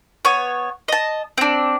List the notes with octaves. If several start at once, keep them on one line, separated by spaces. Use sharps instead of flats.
B3 C#5
D#5 A5
C4 D4